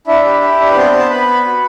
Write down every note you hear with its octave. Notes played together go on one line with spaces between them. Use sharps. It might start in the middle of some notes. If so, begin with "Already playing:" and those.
D4 E4 E5
G4
G4
D4
B4
B3 C4 C5
B3
A5
B3 B4 B5
B3
F#4